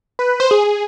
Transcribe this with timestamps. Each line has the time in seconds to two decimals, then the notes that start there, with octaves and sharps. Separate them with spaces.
0.19 B4
0.40 C5
0.51 G#4
0.64 G#4